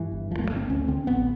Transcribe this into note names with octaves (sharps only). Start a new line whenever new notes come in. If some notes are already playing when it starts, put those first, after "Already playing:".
Already playing: G2 E3
G1
D2 F3
A#3
A3
D3
C4
D2 C#4
D3 C4
A1 B3